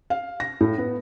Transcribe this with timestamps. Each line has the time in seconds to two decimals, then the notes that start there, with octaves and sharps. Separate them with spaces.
0.10 F5
0.40 A#6
0.61 A2
0.78 B3